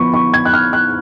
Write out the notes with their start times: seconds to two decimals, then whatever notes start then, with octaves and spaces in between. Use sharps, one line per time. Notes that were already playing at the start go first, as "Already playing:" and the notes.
Already playing: F3 B3 B5 C#6
0.14 C#6
0.34 G#6
0.45 F#6
0.53 F6
0.73 F#6